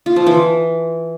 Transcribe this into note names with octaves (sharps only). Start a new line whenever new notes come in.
F4
F3
E3